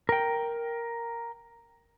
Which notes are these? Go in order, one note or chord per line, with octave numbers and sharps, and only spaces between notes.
A#4 G5